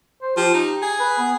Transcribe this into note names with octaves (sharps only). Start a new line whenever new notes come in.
C5
F3 G4
D#4
G#4
B4
B3